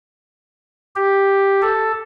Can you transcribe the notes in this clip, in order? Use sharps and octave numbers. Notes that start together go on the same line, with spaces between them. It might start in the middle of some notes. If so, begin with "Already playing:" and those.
G4
A4